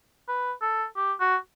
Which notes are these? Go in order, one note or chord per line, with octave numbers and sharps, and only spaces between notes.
B4
A4
G4
F#4